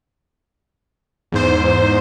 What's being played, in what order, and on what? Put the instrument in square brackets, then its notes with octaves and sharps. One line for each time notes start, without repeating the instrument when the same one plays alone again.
[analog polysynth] E2 G#2 C5